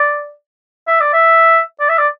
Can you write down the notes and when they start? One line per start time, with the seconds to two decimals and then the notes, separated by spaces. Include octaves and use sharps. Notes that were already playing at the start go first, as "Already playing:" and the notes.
Already playing: D5
0.87 E5
1.00 D5
1.13 E5
1.80 D5
1.89 E5
1.98 D5